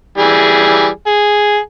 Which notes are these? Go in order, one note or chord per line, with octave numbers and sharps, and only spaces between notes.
E3 G3 G#4
G#4